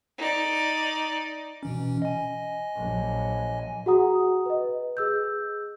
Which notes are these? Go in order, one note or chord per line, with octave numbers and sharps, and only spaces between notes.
D#4 D5
B2 E3 C#4
D#5 G#5
A#1 F#3
F#4 G#4 F#5 A#5 D#6
B4 D#5
G#4 E6 G6